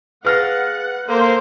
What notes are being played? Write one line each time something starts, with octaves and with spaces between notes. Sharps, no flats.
G#4 B4 F5 F#5 F6 A6 A#6
A#3 A4 C5